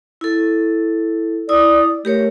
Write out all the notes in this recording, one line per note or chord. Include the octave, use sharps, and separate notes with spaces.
E4 A4
E4 D5 D#6
A3 G4 A#4 C#5